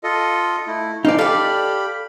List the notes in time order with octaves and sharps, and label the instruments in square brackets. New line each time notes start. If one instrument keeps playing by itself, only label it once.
[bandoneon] F4 A4 D#5
A3 E4
[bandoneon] E3 F3 F5 [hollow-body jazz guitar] D#4 D5
[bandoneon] G4 B5 [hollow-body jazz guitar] A4 [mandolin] D5 F5